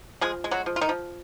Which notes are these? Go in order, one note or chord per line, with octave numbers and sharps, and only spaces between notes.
F3 G#3 G#4
G#3
F#3 F#4
F3
F4
D#3 D#4
F3